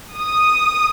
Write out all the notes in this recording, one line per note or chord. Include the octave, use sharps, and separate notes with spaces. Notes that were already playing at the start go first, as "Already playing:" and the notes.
D#6